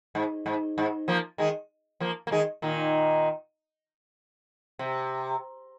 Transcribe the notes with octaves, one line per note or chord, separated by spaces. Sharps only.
G#2
G#2
G#2
F3 A#3
D#3 G#3
F3 A#3
A#3
D#3 G#3
A#2 D#3
C3